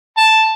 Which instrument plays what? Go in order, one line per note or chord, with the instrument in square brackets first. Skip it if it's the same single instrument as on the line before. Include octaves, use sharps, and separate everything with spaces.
[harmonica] A5